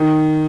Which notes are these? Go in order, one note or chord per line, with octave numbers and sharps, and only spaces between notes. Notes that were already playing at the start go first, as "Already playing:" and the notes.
Already playing: D#3